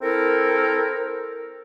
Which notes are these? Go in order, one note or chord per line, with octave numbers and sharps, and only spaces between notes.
C4 E4 A4 A#4